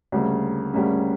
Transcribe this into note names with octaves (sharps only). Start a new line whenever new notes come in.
D2 C#3 G3 A#3
D2 C#3 G3 A#3 C#4